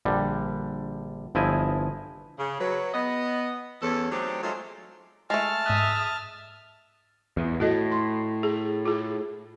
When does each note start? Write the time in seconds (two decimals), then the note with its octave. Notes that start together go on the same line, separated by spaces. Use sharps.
0.05 A#1 D3 G3
1.35 G1 F3 E4 D#5 G#5
2.39 C#3
2.60 F#3 B4
2.94 B3 D#5
3.82 E2 C#4 A4
4.12 F#3 A3 C4 D4 D#4 G4
4.43 F#3 G#3 A3 D#4 F4
5.30 G#3 A3 A5 F6
5.66 G#2 E5 D#6 F#6
7.37 E2
7.60 A2 F#4 A4 D#5
7.91 C6
8.43 G#4
8.85 F4 G#4